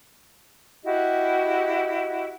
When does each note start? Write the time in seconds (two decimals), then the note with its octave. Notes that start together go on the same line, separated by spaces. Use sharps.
0.84 E4 F#4 G4 D#5